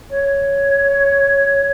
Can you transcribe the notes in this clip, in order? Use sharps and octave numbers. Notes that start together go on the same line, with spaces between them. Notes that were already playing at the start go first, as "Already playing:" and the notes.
C#5